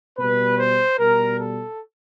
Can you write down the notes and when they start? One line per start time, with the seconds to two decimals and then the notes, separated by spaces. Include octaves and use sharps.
0.19 B2 G3 B4
0.59 C5
0.99 B2 G3 A#4
1.39 A4